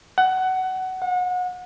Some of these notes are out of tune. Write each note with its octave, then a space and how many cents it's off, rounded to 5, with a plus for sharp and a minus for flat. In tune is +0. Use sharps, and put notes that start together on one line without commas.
F#5 +20
F#5 -30